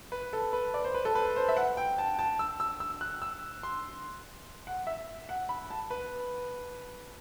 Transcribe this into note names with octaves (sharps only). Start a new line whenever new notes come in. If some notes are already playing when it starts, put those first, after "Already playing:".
B4
A4
B4
D5
C5
B4
A4
B4
C5
E5
F#5
G5
A5
A5
E6
E6
E6
F#6
E6
C6
F#5
E5
F#5
B5
A5
B4